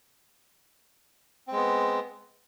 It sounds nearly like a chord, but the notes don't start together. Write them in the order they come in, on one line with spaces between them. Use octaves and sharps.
C4 G#3 B3